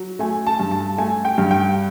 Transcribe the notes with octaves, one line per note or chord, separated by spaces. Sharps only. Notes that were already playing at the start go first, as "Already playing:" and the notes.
Already playing: F#3
A3 G#5
A5
G2
A5
A3 G#5
G5
G2
G5